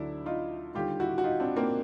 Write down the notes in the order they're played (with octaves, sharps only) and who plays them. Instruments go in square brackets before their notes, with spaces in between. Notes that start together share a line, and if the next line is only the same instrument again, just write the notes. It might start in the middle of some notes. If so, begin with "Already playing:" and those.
Already playing: [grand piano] D2 D3 F#3 D4 E4
D#4 F4
D#2 D3 G3 F4 G4
E4 F#4
F#4
D#4 F4
C4 D4
A#3 C4